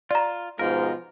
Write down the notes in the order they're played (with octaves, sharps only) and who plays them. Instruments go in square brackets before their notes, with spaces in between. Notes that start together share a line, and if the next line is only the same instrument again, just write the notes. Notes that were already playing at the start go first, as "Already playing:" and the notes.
[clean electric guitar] F4 [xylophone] D5 A#5
[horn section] G#2 B2 F3 [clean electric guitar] A#4